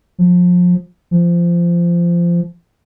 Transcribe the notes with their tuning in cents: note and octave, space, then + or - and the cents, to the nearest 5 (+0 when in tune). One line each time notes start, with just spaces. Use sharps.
F3 +30
F3 -20